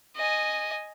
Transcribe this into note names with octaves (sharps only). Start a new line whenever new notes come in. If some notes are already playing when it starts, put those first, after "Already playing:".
D#5 G#5